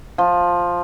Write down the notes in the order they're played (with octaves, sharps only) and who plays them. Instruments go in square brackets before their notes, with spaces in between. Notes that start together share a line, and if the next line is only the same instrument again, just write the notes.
[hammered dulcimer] F3